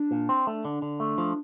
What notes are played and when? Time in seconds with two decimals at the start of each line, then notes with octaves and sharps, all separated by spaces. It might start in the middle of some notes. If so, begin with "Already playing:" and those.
Already playing: D4
0.11 A#2
0.29 C4
0.47 A3
0.64 D3 D4
0.82 D3
1.00 A3
1.18 F3